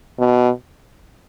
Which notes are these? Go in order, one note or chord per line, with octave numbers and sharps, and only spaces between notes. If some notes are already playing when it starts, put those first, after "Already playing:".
B2